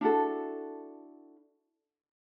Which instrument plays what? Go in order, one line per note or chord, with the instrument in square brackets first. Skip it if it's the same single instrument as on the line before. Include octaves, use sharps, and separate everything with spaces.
[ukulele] D4 E4 F#4 A4